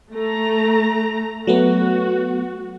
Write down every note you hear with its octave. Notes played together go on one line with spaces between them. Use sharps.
A3 A#5
F#3 A3 B3 F#4